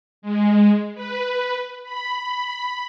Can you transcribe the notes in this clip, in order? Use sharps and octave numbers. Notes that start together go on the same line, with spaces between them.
G#3
B4
B5